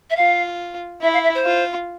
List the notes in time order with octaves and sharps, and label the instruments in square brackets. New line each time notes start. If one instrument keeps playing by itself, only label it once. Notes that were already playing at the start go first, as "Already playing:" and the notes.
[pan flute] E5
[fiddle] F4 [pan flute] F5
[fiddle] E4 [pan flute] E5
[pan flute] F5
E5
C5
[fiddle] F4